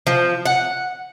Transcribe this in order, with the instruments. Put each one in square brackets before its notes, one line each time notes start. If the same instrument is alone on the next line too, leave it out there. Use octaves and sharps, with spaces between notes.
[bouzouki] F3
F#5